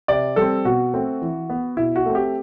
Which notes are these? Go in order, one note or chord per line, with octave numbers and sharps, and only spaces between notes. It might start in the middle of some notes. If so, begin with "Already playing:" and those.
C3 D5
G3 C4 A4
B2 F#4
A3 C4
E3
B3
B2 E4
F#4
A3 C4
G4